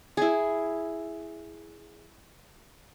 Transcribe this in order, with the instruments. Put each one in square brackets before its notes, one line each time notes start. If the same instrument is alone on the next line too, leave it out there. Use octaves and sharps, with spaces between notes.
[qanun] E4 G#4